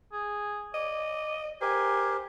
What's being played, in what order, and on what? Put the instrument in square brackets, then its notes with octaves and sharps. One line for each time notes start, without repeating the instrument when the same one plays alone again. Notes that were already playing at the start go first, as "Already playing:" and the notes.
[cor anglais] G#4
[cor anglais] D5 [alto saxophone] D#5
[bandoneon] G4 A#4 [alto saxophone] C5 [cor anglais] G#5